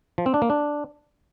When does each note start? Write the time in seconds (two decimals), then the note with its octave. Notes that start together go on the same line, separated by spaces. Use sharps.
0.18 F3
0.26 C4
0.34 D4
0.42 A#3
0.50 D4